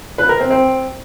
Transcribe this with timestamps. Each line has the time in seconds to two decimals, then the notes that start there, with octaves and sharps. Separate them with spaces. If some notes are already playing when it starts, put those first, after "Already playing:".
0.18 B4
0.29 A#4
0.40 C4
0.50 C4